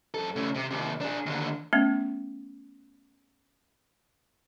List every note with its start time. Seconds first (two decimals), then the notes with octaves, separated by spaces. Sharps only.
0.14 F#2 A4
0.36 C#3 A3
0.55 C3
0.71 D#2 C3
1.01 D4 G#4
1.26 D#2 D3
1.73 A3 B3 C#4